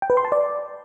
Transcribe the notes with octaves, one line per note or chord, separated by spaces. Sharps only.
G5
B4
C6
A5
D5